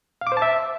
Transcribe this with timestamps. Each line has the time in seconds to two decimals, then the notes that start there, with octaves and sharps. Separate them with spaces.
0.21 F5
0.27 D6
0.32 C5
0.37 A5
0.42 E5